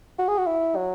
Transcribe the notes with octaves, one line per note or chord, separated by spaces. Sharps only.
F#4
G#4
F#4
E4
F#3